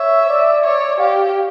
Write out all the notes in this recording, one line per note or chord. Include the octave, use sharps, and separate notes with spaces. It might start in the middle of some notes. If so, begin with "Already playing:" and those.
Already playing: C#5 E5
D5
C#5 D5
G4 F5